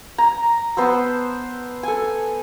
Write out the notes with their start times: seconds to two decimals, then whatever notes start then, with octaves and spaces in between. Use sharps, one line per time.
0.18 A#5
0.77 B3 C5 A5 E6
1.83 A4 G#5